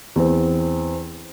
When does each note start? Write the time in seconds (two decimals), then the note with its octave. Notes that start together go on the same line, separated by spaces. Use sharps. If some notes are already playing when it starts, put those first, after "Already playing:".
0.16 E2 C4